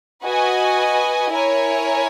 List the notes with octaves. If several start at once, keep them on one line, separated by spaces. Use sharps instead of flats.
F#4 B4 D#5 G#5
E4 A#4 C#5 G#5